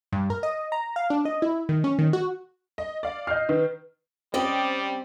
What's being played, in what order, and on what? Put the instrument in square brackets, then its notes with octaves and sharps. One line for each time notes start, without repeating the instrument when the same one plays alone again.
[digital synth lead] G2
A#4
D#5
A#5
F5
D4
D#5
E4
D#3
C#4
D#3
F#4
[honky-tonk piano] D#5
D5 F5
[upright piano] D#5 F6 [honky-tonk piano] G6 C7
[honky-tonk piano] D#3 [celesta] B4
[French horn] G3 [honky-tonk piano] C4 F#7 [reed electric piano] C#4 [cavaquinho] G4 D5 D#5